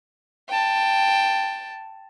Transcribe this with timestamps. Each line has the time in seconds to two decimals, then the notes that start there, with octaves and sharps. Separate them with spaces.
0.49 G5 A5